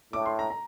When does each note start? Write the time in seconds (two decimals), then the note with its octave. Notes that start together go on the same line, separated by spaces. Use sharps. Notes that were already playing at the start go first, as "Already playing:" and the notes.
0.13 A2 D6
0.26 C6
0.39 A#5
0.50 A#5